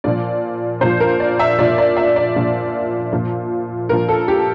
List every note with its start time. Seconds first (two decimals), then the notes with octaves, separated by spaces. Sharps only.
0.04 A#2 F3 D5
0.81 A#2 C5
0.85 F3
1.00 A#4
1.20 D5
1.39 E5
1.58 A#2 F3 D5
1.78 D5
1.97 E5
2.16 D5
2.36 A#2 F3
3.13 A#2 F3
3.89 A#2 F3 A#4
4.09 A4
4.28 G4